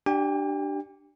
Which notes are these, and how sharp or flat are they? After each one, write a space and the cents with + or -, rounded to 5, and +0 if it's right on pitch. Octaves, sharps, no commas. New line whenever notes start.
D4 +10 G4 -20 G5 +45